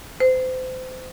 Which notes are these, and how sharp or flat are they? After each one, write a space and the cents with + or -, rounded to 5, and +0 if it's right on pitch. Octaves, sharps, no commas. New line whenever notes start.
C5 -30